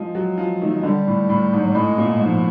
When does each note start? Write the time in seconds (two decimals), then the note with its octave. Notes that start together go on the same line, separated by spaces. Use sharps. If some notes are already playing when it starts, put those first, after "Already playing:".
Already playing: F3 G#3
0.15 F#3
0.38 F3
0.62 D#3
0.65 A3
0.74 G#3
0.83 D3 G3
1.07 A2
1.29 A2
1.53 G#2
1.61 F#3
1.68 G3
1.75 A2 G#3
1.98 A#2
2.21 G#2 F3